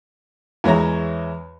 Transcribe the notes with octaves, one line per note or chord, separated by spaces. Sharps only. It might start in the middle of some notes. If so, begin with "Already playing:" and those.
E2 G#3 C#5 E5 A#5